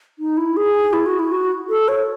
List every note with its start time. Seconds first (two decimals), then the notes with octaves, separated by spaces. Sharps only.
0.19 D#4
0.37 E4
0.57 G#4
0.93 E4
1.06 F#4
1.19 E4
1.32 F#4
1.70 A4
1.88 C#5